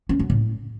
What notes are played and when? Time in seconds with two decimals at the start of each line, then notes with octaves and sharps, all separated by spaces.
0.09 C#4
0.20 F#3
0.30 A2